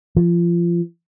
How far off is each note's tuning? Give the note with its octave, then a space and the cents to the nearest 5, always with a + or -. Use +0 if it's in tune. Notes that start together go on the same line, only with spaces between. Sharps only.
F3 -25